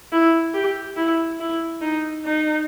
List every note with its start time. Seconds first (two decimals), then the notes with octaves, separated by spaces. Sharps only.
0.12 E4
0.55 G4
0.97 E4
1.40 E4
1.82 D#4
2.25 D#4